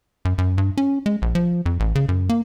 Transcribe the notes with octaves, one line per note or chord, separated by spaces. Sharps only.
F#2
F#2
G2
C#4
G#3
A#1
F3
F2
A1
C#3
F#2
A#3